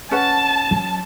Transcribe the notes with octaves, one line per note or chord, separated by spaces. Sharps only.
C#4 B4 F#5 A5
F#3